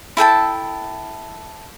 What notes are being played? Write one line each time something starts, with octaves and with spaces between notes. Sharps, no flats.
E4 A4 G5 A5